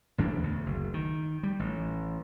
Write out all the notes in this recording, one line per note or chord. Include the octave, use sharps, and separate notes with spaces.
A1 E2 B2 D4
D2
F#1
D#3
G3
A1